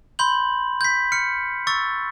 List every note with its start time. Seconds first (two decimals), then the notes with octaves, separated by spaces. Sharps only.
0.19 B5 C6 G6 F#7
0.81 G6 B6
1.12 F6 C#7
1.67 C#6 E6 A6